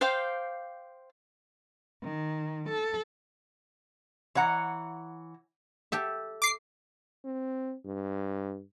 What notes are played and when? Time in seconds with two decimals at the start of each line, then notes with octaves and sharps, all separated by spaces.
0.01 C5 F5 G5 D6
2.03 D#3
2.69 A4
4.35 E3 C#5 F#5 A#5
5.92 G4 A4 E5
6.42 D6 C7
7.25 C4
7.86 G2